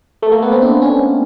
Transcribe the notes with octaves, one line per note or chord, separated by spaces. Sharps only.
A3
A#3
B3
C4
D4
C#4